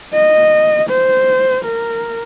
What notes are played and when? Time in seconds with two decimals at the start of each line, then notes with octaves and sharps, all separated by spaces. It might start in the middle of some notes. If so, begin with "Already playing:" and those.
0.13 D#5
0.89 C5
1.64 A#4